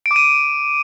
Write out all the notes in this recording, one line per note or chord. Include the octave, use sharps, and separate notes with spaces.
D7
D6
D#7